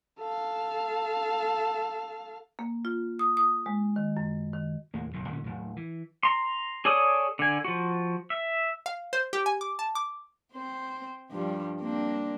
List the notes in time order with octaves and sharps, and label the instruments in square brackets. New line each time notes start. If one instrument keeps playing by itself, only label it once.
[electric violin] A4 F5
[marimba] A#3
F4
D#6
D#6
G#3
D#3
F#2
D#3
[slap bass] D#2 A2 A#3
F#1 B1 E2 A2
D2 A#2 D3 C#4
D#1 A#1 A2 F#3
E3
[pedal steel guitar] A#5 C6
G#4 A4 C#5 D5 D#6
D3 G#5
F3 F#4
E5
[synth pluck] F5
C5
G4
G#5
D6
A5
D6
[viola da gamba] C4 C5
G2 F3 G3
A#3 C4 D4